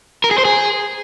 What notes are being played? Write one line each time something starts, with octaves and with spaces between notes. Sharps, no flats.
A#4
G#4
C5
G#4